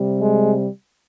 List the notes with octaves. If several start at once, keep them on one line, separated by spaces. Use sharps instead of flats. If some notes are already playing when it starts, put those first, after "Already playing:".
Already playing: C3 G3
G#3